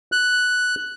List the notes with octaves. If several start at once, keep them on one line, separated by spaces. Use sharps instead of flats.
F#6